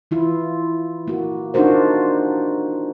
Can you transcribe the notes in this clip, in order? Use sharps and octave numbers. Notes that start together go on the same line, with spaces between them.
E3 E4 F4
A#3 F#4
D4 D#4 F4 F#4 A#4 C5